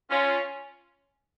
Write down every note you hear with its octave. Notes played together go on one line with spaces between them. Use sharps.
C#4 F4